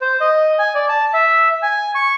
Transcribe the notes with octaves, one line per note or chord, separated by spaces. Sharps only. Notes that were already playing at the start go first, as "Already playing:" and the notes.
C5
D#5
G#5
D5
A5
E5
G#5
C#6